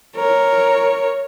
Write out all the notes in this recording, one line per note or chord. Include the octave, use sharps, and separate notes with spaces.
A#4 C#5